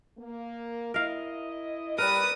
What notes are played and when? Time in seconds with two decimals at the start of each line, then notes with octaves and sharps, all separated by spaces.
0.17 A#3
0.94 E4 A#4 D#5 F5
1.98 G3 A#4 B4 D5 D#6